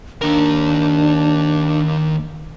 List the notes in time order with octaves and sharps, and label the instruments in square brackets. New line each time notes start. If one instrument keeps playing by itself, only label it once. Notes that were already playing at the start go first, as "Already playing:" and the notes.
[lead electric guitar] D#2 A#4 [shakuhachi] D4